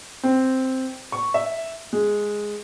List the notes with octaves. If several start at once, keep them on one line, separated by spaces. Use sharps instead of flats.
C4
C#6
E5
G#3